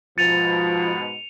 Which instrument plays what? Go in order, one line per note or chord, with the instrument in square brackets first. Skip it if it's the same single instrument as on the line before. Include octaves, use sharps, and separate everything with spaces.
[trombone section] G#2 B2 [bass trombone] F3 [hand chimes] A6 [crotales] C#7 D#7 F7